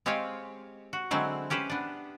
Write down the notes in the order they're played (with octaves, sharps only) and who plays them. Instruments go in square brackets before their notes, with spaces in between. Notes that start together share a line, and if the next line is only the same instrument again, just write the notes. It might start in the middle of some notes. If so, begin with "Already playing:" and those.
[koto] G#3 C4 G4 C#5 D#5 F5
F#4
D3 F#3 G#3 C4 E4
C#4 G4 B4 C5
B3 D4